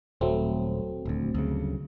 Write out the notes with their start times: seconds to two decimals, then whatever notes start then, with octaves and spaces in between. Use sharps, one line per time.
0.21 D#1 F#3 A3 C4
1.06 D#1 D2
1.34 D2 G2 C#3